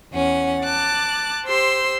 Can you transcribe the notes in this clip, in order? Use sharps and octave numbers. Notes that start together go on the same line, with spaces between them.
E2 C#4 F#5
A5 D6 F#6 A6
G4 C5 C6 E6